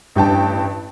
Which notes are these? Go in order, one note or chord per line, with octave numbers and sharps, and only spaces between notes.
A1 G2 G5 A5